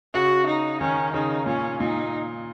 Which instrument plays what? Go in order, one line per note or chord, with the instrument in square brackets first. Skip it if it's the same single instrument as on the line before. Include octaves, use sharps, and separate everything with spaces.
[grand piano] C#3 [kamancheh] F#4
[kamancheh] D#4
[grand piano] D#3 [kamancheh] C#4
[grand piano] C#3 [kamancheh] D#4
[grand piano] A#2 [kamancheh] C#4
[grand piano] A#2 [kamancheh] D#4